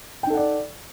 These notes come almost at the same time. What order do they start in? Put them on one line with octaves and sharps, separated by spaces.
G5 D#4 A4 F#5 D5